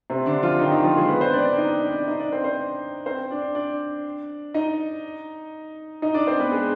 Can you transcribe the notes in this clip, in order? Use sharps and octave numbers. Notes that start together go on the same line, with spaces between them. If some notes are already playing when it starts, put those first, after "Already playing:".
C3 C4
D3 D4
F3 F4
D#3 D#4
D#3 D#4
F3 F4
G#3 G#4
B3 B4
C4 C5
D4 D5
D4 D5
D#4 D#5
D4 D5
D#4 D#5
D4 D5
C4 C5
C4 C5
C4 C5
D4 D5
D4 D5
D#4 D#5
D#4 D#5
D4 D5
C4 C5
B3 B4
G#3 G#4